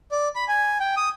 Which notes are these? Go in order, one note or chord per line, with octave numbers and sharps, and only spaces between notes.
D5
B5
G#5
G5
D#6